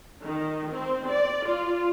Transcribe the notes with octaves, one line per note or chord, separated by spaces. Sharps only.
D#3
C4
D5
F4